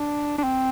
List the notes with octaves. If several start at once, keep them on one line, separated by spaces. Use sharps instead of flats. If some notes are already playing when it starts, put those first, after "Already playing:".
Already playing: D4
D4
C4